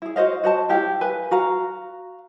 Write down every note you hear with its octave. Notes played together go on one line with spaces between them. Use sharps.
E4 G#4
F#4 C5 D#5 F5
F#4 C5 D#5 A5
E4 G4 F5
B4 G#5
F#4 F5 A#5